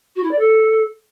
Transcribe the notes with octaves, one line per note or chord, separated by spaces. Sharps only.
F#4
E4
D5
A4